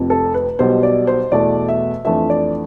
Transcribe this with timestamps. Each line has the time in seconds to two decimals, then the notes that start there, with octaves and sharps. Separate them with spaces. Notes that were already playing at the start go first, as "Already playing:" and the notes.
Already playing: F1 F2 C3
0.10 A4
0.34 B4
0.59 B1 B2 G3 B3 C5
0.83 D5
1.07 C5
1.32 E2 B2 A3 E4 D5
1.69 E5
2.04 F2 E3 A3 D4 F4 E5
2.30 D5